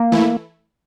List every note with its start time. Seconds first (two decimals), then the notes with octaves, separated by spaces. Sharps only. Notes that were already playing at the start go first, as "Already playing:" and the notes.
Already playing: A#3
0.12 E3 A3 E4